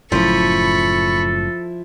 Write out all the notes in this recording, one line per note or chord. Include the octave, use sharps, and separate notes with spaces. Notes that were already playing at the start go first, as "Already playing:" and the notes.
F#1 F#2 A2 F3 E4 A4 B5 C#6